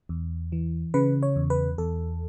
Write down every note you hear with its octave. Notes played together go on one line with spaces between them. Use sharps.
E2
E3
C#3 B4
C#5
E2
B4
E2 A4